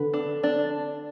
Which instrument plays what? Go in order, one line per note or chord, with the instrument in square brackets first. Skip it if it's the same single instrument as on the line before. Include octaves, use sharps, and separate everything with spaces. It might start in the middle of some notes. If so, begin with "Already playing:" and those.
Already playing: [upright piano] D3 [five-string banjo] B4
[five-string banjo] D4
D4